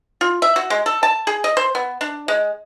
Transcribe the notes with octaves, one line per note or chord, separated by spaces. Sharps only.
F4
E5
F#4
G#3
A4
A5
G#4
D#5
C5
B3
D4
G#3